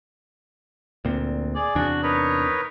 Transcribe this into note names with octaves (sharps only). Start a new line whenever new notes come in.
D2 A#2 C4
G#4 D5
E2 C3 D4 F#4
D#4 A#4 B4 C#5